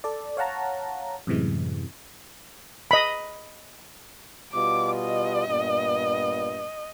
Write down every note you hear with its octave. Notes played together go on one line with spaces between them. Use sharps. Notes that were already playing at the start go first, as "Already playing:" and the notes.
A4 D5
C#5 F5 F#5 A5 A#5
F#2 A2 C3 E3 G#3
D#5 B5
B2 G3 F4 D6
D#5
G2 A#2 B3